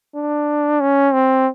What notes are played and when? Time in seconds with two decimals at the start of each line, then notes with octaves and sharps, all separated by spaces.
0.15 D4
0.80 C#4
1.13 C4